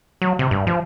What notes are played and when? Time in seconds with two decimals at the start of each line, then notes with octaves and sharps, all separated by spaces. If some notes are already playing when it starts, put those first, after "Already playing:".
0.22 F#3
0.39 C3
0.51 G2
0.67 F3